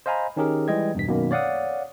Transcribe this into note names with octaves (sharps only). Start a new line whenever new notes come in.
C5 D#5 F5 G#5 A#5 B5
D#3 C#4 D#4 G4 G#4 A#4
E3 G3 G#3 D#5 G5 G#6
E2 G2 B2 B6
F#2 B2 D#3 A#3
C#5 D5 F5 F#5 D#6